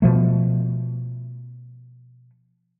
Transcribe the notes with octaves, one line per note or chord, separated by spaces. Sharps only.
B2 F3 A3